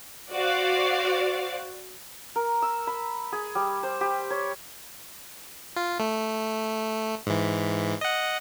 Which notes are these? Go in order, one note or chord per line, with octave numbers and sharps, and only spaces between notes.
F#4 C5 D5 F5
A#4
E6
B5
G#4
G3
C5
G4
C#5
F4
A3
G#2 E3
D#5 F#5